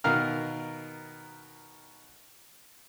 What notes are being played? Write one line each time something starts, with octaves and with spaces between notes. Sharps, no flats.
B2 D#3 A#4 F5 A#5 F6